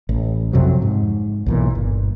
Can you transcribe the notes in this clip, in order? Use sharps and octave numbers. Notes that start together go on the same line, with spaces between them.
A1
F2 C3 F3 F#3
G#2
B1 A#2 E3
G1